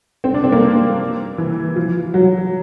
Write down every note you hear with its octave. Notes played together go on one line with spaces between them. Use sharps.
C4
D4
C4
A#3
E3
F3
F#3